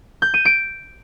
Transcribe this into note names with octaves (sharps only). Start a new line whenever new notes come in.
G6
D#7
D7